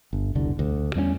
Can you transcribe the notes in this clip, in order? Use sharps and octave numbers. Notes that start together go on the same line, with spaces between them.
G1
E1 C2 D3
D2
E2 G3 A3 C#4